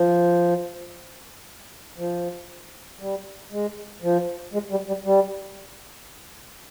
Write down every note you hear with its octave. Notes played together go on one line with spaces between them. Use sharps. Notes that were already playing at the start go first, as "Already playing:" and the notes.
Already playing: F3
F3
G3
G#3
F3
G#3
G3
G3
G3